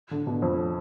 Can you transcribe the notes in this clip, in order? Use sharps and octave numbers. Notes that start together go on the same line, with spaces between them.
D3
B2
F2